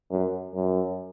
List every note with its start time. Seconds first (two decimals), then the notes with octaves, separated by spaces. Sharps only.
0.11 F#2
0.55 F#2